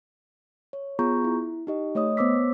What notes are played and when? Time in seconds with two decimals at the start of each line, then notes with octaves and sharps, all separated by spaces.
0.73 C#5
0.99 B3 F4 G#4 A#5 C#6 G6
1.24 E4
1.67 D#4 G4 D#5
1.95 A3 C#5 D#5 D#6
2.17 B3 C5 C#5 D6 E6 B6